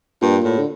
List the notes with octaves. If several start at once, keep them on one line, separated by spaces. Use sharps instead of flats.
G2 A#2
A2
D3